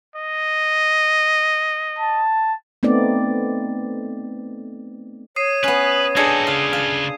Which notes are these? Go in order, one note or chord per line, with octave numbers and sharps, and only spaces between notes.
D#5
A5
A3 B3 C4 D#4 D5
C#5 D#6 C7 D#7
B3 C#4 B4
D4 D#4 F#4 G#4 A4 G#6 C7
C#3 F4 F5
F5